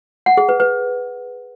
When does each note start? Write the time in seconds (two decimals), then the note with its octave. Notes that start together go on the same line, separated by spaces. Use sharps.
0.26 F#5
0.37 G#4
0.49 B4
0.60 B4